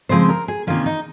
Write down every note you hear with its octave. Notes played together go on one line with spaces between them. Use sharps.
C#3 F3 G#3 C4 C5
A#4
G#4
C3 D#3 A#3 C#4 F4
D#4